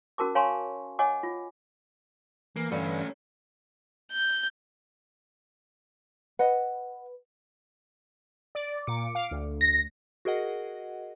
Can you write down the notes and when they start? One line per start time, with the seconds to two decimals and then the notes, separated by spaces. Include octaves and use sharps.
0.18 C#4 F#4 A#4 A5 D6
0.35 C#5 F5 G#5 A#5 C6 C#6
0.99 C#5 D#5 F#5 G#5 D6
1.23 F4
2.57 E3 A#3
2.71 G2 D3 E3 A3 C#4
4.12 G6
6.39 B4 D#5 F#5
8.55 D5
8.87 A#2 D6 C#7
9.15 F5 D6
9.31 D2
9.61 A#6
10.25 F#4 G#4 A#4 D#5 F#5